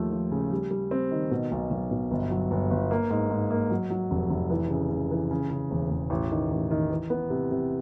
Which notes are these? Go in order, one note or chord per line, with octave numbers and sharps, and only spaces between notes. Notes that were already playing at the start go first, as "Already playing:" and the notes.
Already playing: D#2 F3 A3
F3
C#3
G3
G3
C4
D#3
B2
B1
B1
B2
G1
F#3
G1
G1
A#3
G#2
G#2
A#3
F#3
F#3
F1
F1
E3
C#3
C#3
E3
C#3
C#3
E1
E1
A1
D#3
A1
D#3
E3
B3
C3
C3